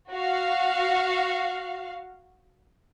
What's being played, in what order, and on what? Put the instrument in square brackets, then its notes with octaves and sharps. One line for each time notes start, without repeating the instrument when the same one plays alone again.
[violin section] F#4 F5